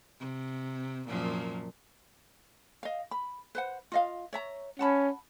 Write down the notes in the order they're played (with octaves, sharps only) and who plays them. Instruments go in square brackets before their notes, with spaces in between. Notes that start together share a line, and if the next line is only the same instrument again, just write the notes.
[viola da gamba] C3
F#2 A#2 F3
[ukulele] D#5 F5
B5
B4 C5 F#5
F4 D#5 F5
C#5 E5 A#5
[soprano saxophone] C#4 [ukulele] F#5 A5 B5